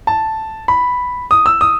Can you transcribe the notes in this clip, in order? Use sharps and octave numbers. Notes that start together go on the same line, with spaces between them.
A5
B5
D#6
E6
D#6